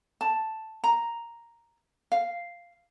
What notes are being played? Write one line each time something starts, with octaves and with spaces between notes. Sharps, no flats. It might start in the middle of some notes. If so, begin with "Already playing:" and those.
A5
A#5
F5